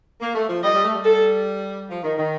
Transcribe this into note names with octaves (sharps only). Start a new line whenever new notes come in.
A#3
A3
F3
G3 D#5
G3
A3
G3
A4
F3
D#3
D#3